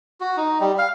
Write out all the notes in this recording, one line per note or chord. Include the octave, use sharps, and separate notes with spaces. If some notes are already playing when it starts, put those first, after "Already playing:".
F#4
D#4
G3
F5